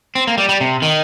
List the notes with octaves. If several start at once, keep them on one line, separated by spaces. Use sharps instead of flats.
C4
A#3
G3
G3
C3
D#3